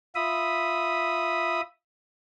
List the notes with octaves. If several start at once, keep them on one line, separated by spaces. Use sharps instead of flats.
F4 E5 B5 D#6